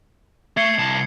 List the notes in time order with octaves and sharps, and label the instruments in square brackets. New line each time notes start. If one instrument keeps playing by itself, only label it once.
[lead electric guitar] A3 [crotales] G#6 C7 C#7
[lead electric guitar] C2 A5